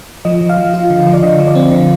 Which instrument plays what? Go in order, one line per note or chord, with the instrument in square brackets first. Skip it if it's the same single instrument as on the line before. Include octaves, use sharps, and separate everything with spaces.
[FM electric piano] F3 D#5
F3
F5
F3
F4
D3
F3
D5
D3 D#5
F3
D5
C4
D3